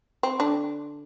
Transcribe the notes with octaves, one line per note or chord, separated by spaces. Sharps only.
C4
D3 D4